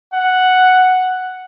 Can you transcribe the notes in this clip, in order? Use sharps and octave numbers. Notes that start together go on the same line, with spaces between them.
F#5